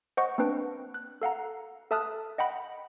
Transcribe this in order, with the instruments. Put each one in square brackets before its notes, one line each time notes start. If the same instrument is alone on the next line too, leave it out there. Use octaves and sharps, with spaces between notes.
[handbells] C5 D#5 F#5 C#6
A#3 C4 D4 B4 G5
F#6
A4 F5 F#5 A#5
A4 E5 A5 D#6 F6 F#6
D#5 F#5 G5 B5